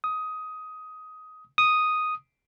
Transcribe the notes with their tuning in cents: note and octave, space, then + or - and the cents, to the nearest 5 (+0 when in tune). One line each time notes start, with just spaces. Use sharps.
D#6 +15
D#6 +0